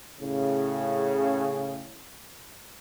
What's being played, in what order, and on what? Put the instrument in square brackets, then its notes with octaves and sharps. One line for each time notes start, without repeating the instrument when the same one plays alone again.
[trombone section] A2 C#3